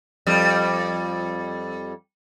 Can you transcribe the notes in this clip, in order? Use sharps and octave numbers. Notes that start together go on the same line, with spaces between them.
F2 G3